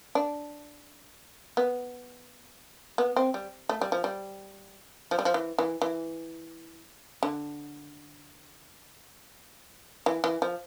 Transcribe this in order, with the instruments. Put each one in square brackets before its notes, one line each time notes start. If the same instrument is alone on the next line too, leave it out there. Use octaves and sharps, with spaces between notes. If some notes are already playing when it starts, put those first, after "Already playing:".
[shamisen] D4
B3
B3
C4
G3
A3
G3
F3
G3
F3
G3
F3
E3
E3
E3
D3
E3
E3
F3